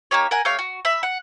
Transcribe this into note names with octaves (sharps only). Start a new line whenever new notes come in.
A#3 D#4 G4 C#5
A#4 F#5 G#5
A3 G4 C#5 F5
F#4
E5 B5
F#5